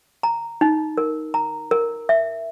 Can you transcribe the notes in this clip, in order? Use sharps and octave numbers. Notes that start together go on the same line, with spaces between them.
A#5
D#4
A#4
A#5
A#4
E5